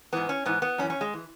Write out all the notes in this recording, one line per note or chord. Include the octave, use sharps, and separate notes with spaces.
G#2 E3 B3
C#4
G#2 E3 B3
B3
F#2 E3 C#4
C#4
G#3
E3